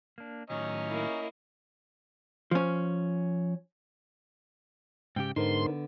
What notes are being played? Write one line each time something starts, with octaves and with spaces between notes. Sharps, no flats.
A#3 D4
A2 D#3 F#3 C#4 D#5 A#5
A#3 E4
F3 C#4
G#2 C#3 G4 G5
G#2 D3 B3 D#4 A#4 C5 C6